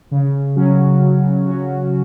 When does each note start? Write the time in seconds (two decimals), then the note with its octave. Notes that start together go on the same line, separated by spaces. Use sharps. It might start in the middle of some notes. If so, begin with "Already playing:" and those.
0.11 C#3
0.56 F#3 C#4 F#4
1.00 C#3
1.46 F#3 C#4 F#4